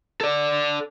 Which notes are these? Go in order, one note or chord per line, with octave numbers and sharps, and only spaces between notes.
A4 D5